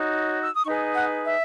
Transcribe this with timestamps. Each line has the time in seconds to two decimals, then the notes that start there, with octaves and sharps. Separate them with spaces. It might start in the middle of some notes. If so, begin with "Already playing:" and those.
Already playing: D#4 F#4 C#5
0.42 E6
0.54 D#6
0.64 D#4 G#4 B4 C#6
0.94 F#5
1.23 E5